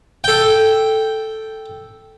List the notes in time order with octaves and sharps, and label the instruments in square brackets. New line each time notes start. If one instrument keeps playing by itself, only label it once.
[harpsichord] A4 G5